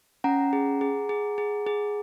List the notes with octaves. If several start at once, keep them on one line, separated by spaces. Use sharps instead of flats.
C#4 F#5 A#5
G#4
G#4
G#4
G#4
G#4